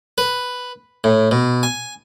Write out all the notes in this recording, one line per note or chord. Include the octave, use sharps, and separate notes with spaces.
B4
A2
B2
G#5